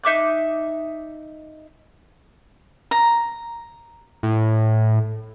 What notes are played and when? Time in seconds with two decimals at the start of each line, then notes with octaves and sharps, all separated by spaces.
0.04 D#4 E5 D6 F#6
2.91 A#5
4.23 A2